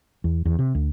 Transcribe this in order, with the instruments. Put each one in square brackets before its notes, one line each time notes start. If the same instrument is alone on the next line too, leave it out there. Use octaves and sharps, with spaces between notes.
[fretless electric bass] E2
E2
C3
D2